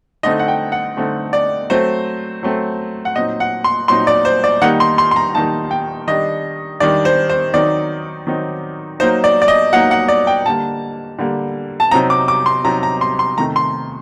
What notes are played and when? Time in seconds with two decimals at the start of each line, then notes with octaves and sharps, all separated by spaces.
0.23 D3 A3 C4 D#4 D#5
0.39 F#5
0.48 G5
0.72 F#5
0.97 D3 A3 C4 D#4
1.33 D5
1.70 F#3 A3 C4 C5
2.43 F#3 A3 C4
3.05 F#5
3.16 A#2 F#3 C4 D#4 D#5
3.40 F#5
3.64 C6
3.88 A#2 F#3 C4 D#4 C6
4.07 D5
4.25 C5
4.44 D5
4.62 D#3 G3 A#3 D#4 F#5
4.80 C6
4.98 C6
5.11 C6
5.16 A#5
5.35 D#3 G3 A#3 D#4 A5
5.71 G5
6.07 D#3 G3 D4 D#5
6.80 D#3 G3 D4 D5
7.05 C5
7.29 C5
7.54 D#3 F#3 C4 D#4 D5
8.27 D#3 F#3 C4 D#4
9.00 F#3 A#3 D#4 C5
9.24 D5
9.42 D5
9.48 D#5
9.73 F#3 A#3 D#4 F#5
9.91 F#5
10.08 D5
10.27 G5
10.46 D3 G3 A#3 A5
11.19 D3 G3 A#3
11.80 A5
11.91 C3 F#3 C4 D#4 A#5
12.10 D6
12.28 D6
12.46 C6
12.64 C3 F#3 C4 D#4 A#5
12.83 A#5
13.01 C6
13.19 C6
13.37 C3 D#3 A3 A#5
13.56 C6